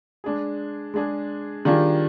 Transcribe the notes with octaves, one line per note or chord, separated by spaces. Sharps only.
G#3 D4 G#4
G#3 D4 G#4
D#3 G3 D4 F4 G#4